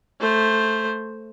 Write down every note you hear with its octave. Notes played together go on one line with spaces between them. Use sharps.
A3 C5